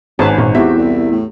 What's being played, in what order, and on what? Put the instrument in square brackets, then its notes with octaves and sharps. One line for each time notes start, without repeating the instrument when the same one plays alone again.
[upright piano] G#1 [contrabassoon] G#2 [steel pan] C#4 B4 A5
[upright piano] G#1 [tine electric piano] A#2
[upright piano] E2 C4 E5 [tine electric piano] B3 E4 [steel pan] F#4 G4
[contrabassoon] C2
A2